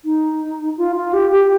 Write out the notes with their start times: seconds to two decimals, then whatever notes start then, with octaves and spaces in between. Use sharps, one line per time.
0.05 D#4
0.78 F4
0.96 F4
1.13 G4
1.31 G4